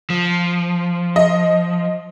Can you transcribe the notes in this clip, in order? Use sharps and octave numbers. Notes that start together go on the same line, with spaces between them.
F3
D#5